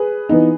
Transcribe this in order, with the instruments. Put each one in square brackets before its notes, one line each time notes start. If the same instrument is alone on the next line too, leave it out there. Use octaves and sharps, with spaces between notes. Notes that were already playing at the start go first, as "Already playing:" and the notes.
Already playing: [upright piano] G#4 B4
E3 B3 D#4